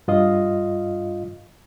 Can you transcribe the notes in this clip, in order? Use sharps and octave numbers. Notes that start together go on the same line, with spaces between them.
G2 F4 D#5 F5